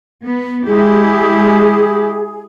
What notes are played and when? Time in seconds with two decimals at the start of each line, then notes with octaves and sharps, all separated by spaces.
0.24 B3
0.66 G#3 E4 G4 G#4